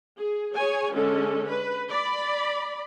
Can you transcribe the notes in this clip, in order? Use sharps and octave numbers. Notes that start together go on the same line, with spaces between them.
G#4
G#4 C#5 G#5
D3 G#3 C#4 A4
B4
D5 B5